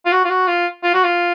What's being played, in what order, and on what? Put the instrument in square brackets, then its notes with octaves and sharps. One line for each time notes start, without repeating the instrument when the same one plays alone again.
[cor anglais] F4
F#4
F4
F#4
F4
F4
F#4
F4